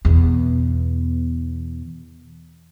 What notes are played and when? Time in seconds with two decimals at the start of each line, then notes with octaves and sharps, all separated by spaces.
0.05 E2 B2